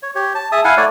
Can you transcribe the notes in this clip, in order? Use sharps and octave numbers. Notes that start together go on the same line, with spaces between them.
C#5
G4 C#5
A5
G#4 E5 A5 D#6
E4 F5 F#5 G#5
A3 C#5 D5